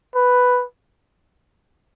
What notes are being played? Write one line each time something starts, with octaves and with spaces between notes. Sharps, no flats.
B4